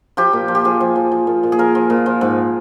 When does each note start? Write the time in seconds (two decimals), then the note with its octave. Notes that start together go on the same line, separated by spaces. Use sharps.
0.17 F3 G4
0.33 A#2
0.48 F3
0.55 G4
0.65 F3 G#4
0.80 F3
0.96 F3
1.12 F3
1.27 A#2
1.43 A#2
1.52 G#4
1.59 F3 A#4
1.75 F3
1.90 A#2
2.06 F3
2.21 G#2